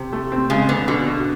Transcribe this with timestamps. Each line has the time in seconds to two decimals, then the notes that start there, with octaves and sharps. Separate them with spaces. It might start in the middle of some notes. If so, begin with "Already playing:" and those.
Already playing: C3
0.13 A3
0.32 C4
0.50 C#3 G#3
0.69 D3 B3
0.88 B2 D3
1.06 B2